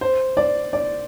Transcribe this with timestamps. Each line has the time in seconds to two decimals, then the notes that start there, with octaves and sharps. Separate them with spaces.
0.01 C5
0.37 D5
0.73 D5